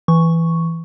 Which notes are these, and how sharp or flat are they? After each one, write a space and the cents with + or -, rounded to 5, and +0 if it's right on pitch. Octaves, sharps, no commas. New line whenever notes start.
E3 +5 C#6 +0